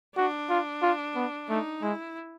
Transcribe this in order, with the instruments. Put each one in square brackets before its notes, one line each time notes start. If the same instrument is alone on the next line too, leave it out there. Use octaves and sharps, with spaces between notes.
[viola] D4 [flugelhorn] F#4
[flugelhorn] F4
F4
B3
[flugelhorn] A3 [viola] D#4
[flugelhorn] G#3 [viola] E4